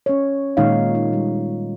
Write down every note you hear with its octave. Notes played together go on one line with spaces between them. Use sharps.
C#4 C#5
A#2 D#3 G#3 D#4 C#5 F5
D#4
G3